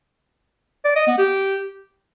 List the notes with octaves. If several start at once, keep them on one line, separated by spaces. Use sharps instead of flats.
D5
D#5
B3
G4